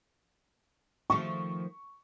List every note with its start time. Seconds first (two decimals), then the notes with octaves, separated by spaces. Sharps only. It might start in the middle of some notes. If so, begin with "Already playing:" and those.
1.10 D#3 F3 A3 C#6